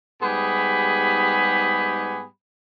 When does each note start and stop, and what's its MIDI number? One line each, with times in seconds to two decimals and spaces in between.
0.22 2.26 44
0.22 2.26 55
0.22 2.26 59
0.22 2.26 67
0.22 2.26 68
0.22 2.26 83